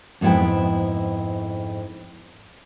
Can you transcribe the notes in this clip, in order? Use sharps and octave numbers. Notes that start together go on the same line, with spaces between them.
F2 G#2 B3 E4 G5